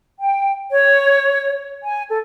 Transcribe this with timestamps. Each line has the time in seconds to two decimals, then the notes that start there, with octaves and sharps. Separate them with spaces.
0.19 G5
0.71 C#5
1.84 G#5
2.09 A4